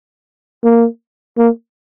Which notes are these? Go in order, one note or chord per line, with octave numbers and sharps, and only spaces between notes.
A#3
A#3